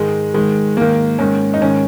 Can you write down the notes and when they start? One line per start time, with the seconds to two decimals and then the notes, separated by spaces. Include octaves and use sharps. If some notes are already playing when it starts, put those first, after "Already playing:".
Already playing: G#2 D#3 G#3
0.34 G#2 D#3 G#3
0.77 G#2 D#3 A#3
1.19 G#2 D#3 C#4
1.54 D#4
1.61 G#2 D#3 C#4